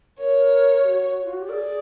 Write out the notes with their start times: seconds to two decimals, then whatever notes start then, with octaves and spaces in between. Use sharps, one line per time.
0.19 A#4 C#5
0.84 G4
0.88 F#4
1.25 F4
1.33 F#4
1.41 G4
1.49 G#4 A#4 D5